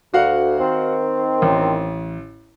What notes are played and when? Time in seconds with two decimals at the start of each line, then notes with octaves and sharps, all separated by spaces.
0.14 D2 F#4 F5 F#5
0.59 D#3 C4
1.42 A1